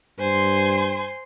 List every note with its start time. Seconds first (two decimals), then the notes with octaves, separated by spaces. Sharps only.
0.19 G2 C5 G#5 C6